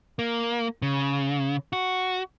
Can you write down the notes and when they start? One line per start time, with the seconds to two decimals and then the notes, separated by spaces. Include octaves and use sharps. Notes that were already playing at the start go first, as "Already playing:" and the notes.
0.19 A#3
0.82 C#3
1.73 F#4